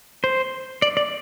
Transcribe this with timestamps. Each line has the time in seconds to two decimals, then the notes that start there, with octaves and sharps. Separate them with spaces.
0.24 C5
0.82 D5
0.97 D5